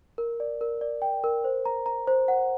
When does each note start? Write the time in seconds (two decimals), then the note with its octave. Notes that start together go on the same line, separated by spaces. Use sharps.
0.18 A#4
0.40 D5
0.61 A#4
0.81 D5
1.02 G5
1.24 A#4
1.44 C5
1.65 A#5
1.86 A#5
2.07 C5
2.28 F#5